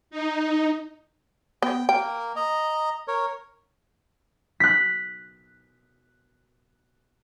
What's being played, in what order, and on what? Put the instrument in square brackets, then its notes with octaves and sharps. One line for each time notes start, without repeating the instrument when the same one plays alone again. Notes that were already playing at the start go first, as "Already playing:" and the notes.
[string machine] D#4
[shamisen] B3 [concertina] G5
[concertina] A#3 A#4 [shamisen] G5
[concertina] D#5 A#5
A#4 C#5
[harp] F#6 B6